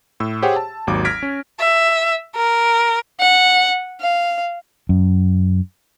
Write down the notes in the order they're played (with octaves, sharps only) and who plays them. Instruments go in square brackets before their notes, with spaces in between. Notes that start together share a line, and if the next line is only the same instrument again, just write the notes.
[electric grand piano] A2 E6
G4 G#4 C5 C#5 F#5 G5
A5
G#1 D#2 F#3 D6
F6 G#6 A#6 B6 D7
C#4
[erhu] E5
A#4
[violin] F#5
F5
[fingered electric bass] F#2